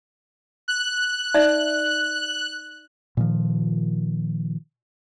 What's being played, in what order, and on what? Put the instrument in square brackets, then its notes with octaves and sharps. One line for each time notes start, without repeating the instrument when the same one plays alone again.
[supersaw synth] F#6
[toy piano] D#4 D5 E5
[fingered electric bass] A#2 D#3 F3